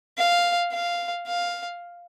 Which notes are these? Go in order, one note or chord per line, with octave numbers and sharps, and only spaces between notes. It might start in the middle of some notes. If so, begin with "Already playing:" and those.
F5
F5
F5